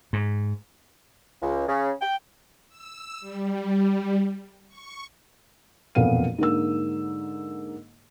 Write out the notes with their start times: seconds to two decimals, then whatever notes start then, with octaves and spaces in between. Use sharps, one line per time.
0.13 G#2
1.42 C#2
1.68 C#3
2.02 G5
2.69 E6
3.20 G3
4.68 C#6
5.95 E1 F2 A#2 B3 F5 D#7
6.38 G#2 D3 A#3 E6